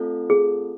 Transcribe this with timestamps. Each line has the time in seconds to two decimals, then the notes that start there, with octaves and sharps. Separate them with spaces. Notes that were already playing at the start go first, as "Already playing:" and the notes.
Already playing: A3 C4 F4 A4
0.30 G#4